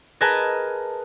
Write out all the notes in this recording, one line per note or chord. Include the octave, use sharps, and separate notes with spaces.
G#4 A#4 B4 D#5 G#5 A5